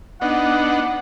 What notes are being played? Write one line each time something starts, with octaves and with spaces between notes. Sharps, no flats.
B3 D4 D#4 F#5